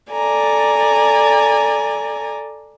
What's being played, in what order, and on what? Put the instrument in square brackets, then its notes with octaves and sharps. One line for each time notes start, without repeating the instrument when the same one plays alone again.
[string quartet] A4 D5 G#5 A#5